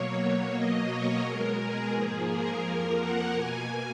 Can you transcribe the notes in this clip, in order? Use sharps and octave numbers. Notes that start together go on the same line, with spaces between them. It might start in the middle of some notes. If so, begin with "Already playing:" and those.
Already playing: B2 F#3 A#3 C#5
B2 F#3 A#3 D#5
C#5
B2 G#3 A#4
G#4
G#2 F3 A#3
A#4
F2 F3 A#3 A#4
F#5
B2 A#3 G#5